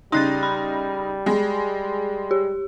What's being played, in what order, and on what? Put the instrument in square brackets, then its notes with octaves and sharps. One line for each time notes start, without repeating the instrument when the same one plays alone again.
[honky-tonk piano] C#3 D#4 [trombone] G3 [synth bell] C6 F#6 A6
[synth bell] B5
[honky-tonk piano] G#3
[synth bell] G4